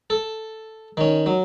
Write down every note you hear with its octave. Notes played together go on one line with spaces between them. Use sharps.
A4
D#3 C#4
F#3